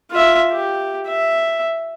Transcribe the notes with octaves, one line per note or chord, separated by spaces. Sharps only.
F4 E5
G4
E5